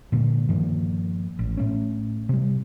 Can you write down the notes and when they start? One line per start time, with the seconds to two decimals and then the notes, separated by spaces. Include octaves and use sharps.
0.12 A#2 D3 A#3
0.49 G2 D#3 F3 A#3
1.39 A1
1.57 A2 A3 C#4
2.29 C3 G3